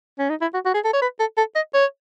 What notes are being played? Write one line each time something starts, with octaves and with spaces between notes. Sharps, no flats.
C#4
D#4
E4
F#4
F#4
G#4
A4
C#5
B4
A4
A4
D#5
C#5